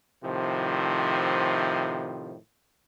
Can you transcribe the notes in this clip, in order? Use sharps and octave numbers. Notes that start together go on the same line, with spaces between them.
A2 C3 D#3 F3